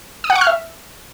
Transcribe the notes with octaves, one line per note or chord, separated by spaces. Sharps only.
D#6
F#5
C#6
F6
E5